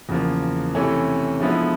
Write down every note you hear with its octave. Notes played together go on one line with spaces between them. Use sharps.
E2 C#3 F3 A#3
C3 E3 A3 C#4
D3 F3 G#3 B3 E4